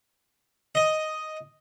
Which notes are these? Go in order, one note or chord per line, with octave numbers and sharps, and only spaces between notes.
D#5